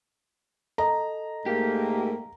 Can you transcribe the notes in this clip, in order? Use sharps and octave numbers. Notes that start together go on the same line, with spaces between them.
A4 D#5 A#5
G#2 A3 A#3 G4